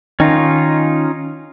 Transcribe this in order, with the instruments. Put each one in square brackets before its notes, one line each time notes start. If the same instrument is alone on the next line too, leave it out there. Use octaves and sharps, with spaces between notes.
[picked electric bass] D#3 [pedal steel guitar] C#4 D#4 F4